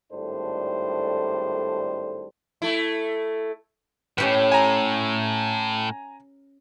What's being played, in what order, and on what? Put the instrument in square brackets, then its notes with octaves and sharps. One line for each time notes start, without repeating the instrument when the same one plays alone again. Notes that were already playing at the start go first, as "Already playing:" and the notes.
[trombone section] G#1 A2 G3 D4 A4 C5
[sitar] A3 E4
[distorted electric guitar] A2 [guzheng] C#4 G4 B4
[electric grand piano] G#5 A#5